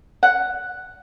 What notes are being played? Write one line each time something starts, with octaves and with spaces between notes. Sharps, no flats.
F#5